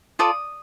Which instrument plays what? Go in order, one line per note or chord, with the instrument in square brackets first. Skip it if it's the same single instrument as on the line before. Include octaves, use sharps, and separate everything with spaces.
[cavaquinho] F4 A4 D5 D#6